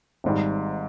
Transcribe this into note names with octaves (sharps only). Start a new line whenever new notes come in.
G#1 G#2 G3